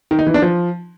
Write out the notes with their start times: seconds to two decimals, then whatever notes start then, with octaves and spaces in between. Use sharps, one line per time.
0.11 D#3
0.19 D#4
0.27 E3
0.34 D4
0.42 F3